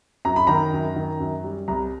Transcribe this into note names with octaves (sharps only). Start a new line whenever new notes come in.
F#2 A#5
B5
D#3 A#5
F#2
D#3
F#2
G3
C2 A#5